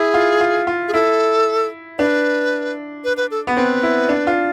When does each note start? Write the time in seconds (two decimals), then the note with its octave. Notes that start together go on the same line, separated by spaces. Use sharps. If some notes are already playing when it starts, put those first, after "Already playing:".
Already playing: E4 G#4
0.14 F4
0.41 F4
0.67 F4
0.88 G#4
0.94 E4 A4
1.99 D4 B4
3.04 B4
3.17 B4
3.31 A4
3.47 B3
3.57 C4 B4
3.83 E4
4.09 D4
4.27 F4